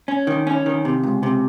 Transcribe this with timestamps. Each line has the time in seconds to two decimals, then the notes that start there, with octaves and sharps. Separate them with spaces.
0.08 C#4
0.27 D#3
0.47 C#4
0.66 D#3
0.85 C3
1.03 C#2
1.23 C3